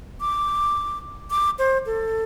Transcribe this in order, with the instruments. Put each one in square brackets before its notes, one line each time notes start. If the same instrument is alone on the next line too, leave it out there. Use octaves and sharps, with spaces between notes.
[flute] D6
D6
C5
A4